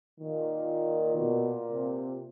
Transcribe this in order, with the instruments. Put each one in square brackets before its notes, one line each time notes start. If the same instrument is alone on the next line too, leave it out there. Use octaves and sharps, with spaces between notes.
[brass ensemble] A#2 [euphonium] D#3
[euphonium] B2
C3